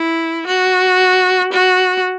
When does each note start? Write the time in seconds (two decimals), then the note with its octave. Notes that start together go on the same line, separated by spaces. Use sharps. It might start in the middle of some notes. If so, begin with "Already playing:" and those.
Already playing: E4
0.47 F#4
1.53 F#4